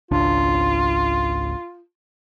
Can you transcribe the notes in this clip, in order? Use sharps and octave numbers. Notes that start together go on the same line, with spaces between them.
G#1 C#2 D4 F4